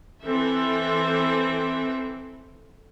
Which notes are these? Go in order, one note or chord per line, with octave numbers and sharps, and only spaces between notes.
E3 C4 A4 E5